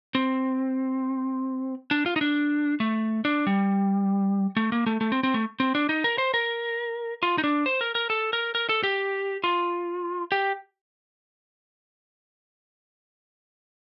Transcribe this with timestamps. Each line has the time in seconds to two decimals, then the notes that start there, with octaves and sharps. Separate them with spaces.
0.15 C4
1.91 D4
2.06 F4
2.16 D#4
2.21 D4
2.80 A3
3.25 D4
3.47 G3
4.57 A3
4.72 A#3
4.86 A3
5.01 A3
5.12 C4
5.23 C4
5.34 A3
5.60 C4
5.75 D4
5.89 D#4
6.04 A#4
6.18 C5
6.34 A#4
7.23 F4
7.38 D#4
7.44 D4
7.66 C5
7.81 A#4
7.95 A#4
8.10 A4
8.33 A#4
8.55 A#4
8.69 A4
8.83 G4
9.44 F4
10.32 G4